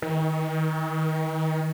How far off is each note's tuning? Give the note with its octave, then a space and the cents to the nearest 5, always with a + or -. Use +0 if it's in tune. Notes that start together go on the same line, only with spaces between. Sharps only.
D#3 +30